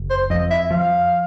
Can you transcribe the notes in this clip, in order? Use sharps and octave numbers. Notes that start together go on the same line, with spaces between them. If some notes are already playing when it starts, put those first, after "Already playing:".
Already playing: F#1
C5
F2 D#5
E5
F3 F5